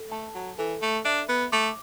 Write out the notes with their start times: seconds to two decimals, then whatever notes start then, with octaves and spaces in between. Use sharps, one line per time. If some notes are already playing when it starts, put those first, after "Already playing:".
Already playing: A4
0.11 A3 A5
0.35 F#3
0.58 E3 A4
0.82 A3
1.05 D4 E5
1.29 B3
1.52 A3 D6